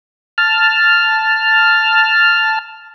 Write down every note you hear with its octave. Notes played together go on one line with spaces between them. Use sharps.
A5 F6